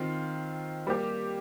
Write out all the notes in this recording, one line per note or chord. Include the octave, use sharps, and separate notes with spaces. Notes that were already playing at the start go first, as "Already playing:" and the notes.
Already playing: D#3 C4 F4
G3 A#3 G4